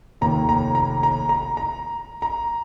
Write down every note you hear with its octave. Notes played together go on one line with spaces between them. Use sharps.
F1 D#2 D#3 A#3 A#5
A#5
A#5
A#5
A#5
A#5
A#5